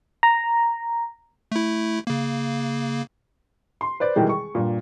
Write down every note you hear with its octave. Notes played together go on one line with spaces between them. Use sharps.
A#5
A3 E4
C#3 A#3
C6
B4 C5 D5
B2 D#3 E3 G3 G#3 B3
G#4 C#6
G2 A#2